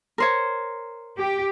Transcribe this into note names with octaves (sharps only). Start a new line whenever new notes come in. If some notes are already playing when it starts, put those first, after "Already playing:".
A#4 C5 C#5
G4